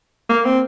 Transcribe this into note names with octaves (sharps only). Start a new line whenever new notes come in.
A#3
C4